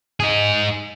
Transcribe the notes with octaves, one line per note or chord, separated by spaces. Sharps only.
D#4 G#4